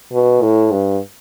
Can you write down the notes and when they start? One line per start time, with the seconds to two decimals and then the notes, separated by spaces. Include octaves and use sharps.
0.13 B2
0.42 A2
0.72 G2